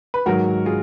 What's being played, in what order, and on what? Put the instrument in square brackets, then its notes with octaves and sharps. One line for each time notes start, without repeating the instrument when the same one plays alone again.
[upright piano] B4
[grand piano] G#2 D#3 F#3 [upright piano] F#4 A#4
[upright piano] F4 G#4